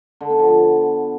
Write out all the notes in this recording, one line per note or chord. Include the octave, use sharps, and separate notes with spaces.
D3
B3
F3
B3